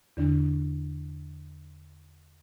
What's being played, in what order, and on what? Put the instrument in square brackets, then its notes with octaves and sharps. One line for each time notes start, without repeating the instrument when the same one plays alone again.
[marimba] E2 D3 D4